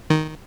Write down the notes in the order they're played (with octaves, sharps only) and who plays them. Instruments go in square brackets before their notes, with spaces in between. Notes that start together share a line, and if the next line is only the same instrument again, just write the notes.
[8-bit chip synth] D#3